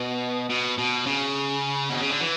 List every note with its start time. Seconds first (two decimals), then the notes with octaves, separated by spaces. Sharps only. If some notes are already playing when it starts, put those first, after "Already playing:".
Already playing: B2
0.50 B2
0.78 B2
1.06 C#3
1.90 B2
2.00 C#3
2.10 D3
2.20 E3